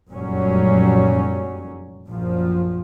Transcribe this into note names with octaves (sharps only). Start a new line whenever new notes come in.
F1 F#2 A#2 F#3 G3 C#4
A#1 F#2 F3